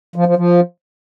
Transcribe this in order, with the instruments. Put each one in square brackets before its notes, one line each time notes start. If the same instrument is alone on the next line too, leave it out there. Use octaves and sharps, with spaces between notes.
[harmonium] F3
F3
F3